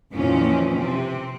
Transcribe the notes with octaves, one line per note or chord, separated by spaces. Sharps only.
F2 A#2 D#3 E3 C4 C#4
C3 C4